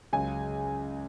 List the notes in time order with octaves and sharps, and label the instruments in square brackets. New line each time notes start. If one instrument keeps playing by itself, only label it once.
[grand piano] C#2 C#3 F#3 G#5